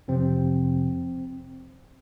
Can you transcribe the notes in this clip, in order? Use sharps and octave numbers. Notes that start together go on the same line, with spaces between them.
F2 C3 F3 C4